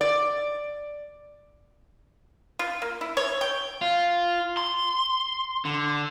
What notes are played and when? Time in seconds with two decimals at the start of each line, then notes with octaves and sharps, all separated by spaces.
0.01 D5
2.59 F4
2.82 A#3
3.01 E4
3.17 C#5
3.41 G5
3.81 F4
4.57 C6
5.65 D3